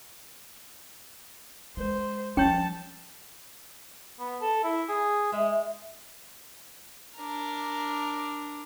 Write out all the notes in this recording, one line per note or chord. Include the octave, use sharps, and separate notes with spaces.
G#3 C5
F3 G3 C#4 C#5 G5 A5
B3
A4
E4
G#4
G#3 E5
D4 A#4